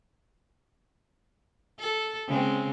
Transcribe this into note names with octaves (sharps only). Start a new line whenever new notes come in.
A4
C#3 G#3 C4